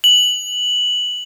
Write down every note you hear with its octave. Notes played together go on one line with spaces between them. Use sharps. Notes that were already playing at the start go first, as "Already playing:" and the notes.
F#7